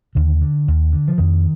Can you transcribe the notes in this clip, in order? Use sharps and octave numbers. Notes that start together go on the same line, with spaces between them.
D#2 D3
D3
D#2
D3
F3
F2 D#3